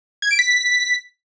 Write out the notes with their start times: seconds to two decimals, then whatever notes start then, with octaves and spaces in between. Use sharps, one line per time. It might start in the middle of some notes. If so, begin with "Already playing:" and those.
0.22 G#6
0.31 D7
0.39 B6